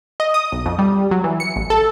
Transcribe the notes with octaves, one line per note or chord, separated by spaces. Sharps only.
D#5
D#6
B1
F2
G3
F#3
E3
C#7
A1
A4